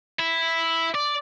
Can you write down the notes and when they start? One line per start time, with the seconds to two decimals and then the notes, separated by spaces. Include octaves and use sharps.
0.20 E4
0.95 D5